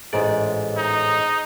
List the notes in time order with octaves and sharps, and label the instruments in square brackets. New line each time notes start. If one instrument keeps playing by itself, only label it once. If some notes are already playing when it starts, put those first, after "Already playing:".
[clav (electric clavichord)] A1 G#2 D5 [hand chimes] G#4 C5 D#5
[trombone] D#4